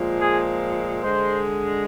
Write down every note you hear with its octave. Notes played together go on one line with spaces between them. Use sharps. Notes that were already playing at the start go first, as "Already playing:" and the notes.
Already playing: A#2 F3 G#3
G#4
D3 G#3 C5